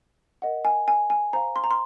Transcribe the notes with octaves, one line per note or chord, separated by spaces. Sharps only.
A#4 D#5 F#5
G#5
G#5
G#5
C5 F5 A#5
C6
A#5
C6